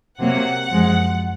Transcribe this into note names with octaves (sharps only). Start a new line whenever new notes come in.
C3 F#3 A#3 F#5
F#2 F3 G#3